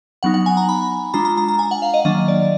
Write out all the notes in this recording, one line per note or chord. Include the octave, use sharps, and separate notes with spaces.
F#3 B3 D#4 F#5
F#5
G#5
A#5
B5
G#3 D4 F4 A#5
A#5
A#5
A#5
G#5
F#5
F5
D#5
D#3 F#3 A#3 D4 D#5
D5